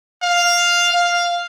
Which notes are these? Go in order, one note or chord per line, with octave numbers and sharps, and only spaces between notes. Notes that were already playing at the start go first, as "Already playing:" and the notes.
F5
F5